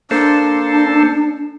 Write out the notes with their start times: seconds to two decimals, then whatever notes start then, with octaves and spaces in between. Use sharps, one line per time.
0.11 A#3 D4 A4 C5